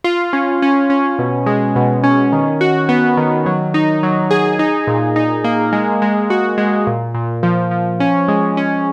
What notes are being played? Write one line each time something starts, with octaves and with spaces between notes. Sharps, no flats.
F4
C#4
C#4
C#4
B2
G#3
B2
C#4
D#3
F#4
B3
D#3
F#3
D#4
F#3
G#4
D#4
A#2
D#4
A#3
G#3
G#3
F#4
G#3
A#2
A#2
F3
F3
C#4
G#3
C#4